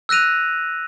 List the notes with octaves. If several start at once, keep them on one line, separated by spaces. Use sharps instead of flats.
E6 F#6 A#6 D#7 F7